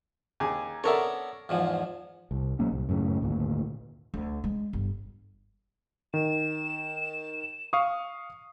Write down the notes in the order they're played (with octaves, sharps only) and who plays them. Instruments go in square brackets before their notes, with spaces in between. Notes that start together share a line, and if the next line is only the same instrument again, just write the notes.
[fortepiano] D#2 G#4
[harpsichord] B3 D4 C#5 [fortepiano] A4 A#4 E5
[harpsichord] E2 G#2 F3
[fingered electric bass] C2
A#2 F#3 A#3 C#4
C2
F#2 A2 C#3
G#1 D2 A#2
[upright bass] D2
G#3
G1
[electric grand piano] D#3 [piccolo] E7
[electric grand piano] F5 C#6 D#6